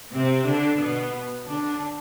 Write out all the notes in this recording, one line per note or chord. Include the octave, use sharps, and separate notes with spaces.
C3 C4
D3 D4
B2 B3
D3 D4